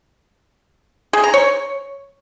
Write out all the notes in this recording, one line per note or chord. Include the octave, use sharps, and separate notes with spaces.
G#4
A#5
C#5